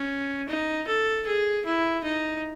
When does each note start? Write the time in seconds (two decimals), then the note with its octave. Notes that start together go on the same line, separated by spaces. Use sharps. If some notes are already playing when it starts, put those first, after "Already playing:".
Already playing: C#4
0.49 D#4
0.88 A4
1.27 G#4
1.65 E4
2.03 D#4